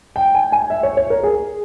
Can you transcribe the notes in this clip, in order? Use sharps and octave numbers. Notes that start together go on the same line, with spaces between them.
G5
G#5
G#5
E5
C#5
C#5
A#4
G#4